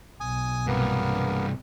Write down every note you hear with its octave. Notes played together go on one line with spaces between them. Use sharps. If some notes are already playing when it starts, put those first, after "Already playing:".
B1 G#5 D#6
G2 C3 A#3 B3